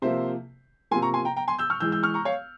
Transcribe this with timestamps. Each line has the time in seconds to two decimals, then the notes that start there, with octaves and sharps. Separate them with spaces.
0.02 C3 F3 A#3 C5 E5
0.91 C3 F3 A#3 G#5 C6
1.02 A#5 C#6
1.14 G#5 C6
1.25 G5 A#5
1.36 G5 A#5
1.48 G#5 C6
1.59 E6 G6
1.70 C#6 F6
1.80 E3 G#3 E6 G6
1.92 E6 G6
2.03 C#6 F6
2.14 A#5 C#6
2.25 C#5 F5